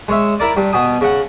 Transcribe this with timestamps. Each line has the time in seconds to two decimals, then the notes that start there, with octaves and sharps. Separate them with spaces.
0.08 G#3 C#5 E5
0.40 E4 A#4 D5
0.57 G2
0.73 B2 G#5 D#6
1.01 C#3 F#5